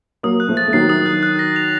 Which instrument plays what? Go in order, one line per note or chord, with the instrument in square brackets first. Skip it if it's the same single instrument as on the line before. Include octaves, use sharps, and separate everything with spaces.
[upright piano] F#3 A#3 [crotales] D#6
[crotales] F#6
[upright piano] F3 A3
[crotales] A6
[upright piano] A3
[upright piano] D#3 F#3 [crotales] C7
[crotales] D#6
F#6
F#6
A#6
F7